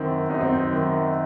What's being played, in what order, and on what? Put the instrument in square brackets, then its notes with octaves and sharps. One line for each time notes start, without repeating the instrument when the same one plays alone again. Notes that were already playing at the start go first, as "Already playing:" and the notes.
Already playing: [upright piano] F#2 D#3 C4
F#2 D#4
C4
D#4
D#3